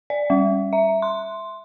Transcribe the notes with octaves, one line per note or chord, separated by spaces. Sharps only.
D5
G3
E5
C6